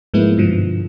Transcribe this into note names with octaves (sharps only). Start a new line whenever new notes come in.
G#2 F3 G#3 A#3 B3 E4
G2 B2 D3 F3